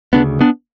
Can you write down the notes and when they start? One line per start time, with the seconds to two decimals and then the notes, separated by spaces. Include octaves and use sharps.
0.13 D2 C#3 B3 D4
0.41 B3 D4